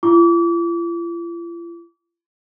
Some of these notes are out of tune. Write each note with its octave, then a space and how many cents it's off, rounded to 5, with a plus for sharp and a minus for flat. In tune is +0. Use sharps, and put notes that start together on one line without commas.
F4 -45 D6 -35